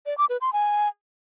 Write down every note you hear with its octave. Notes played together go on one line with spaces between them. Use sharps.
D5
D6
B4
C6
G#5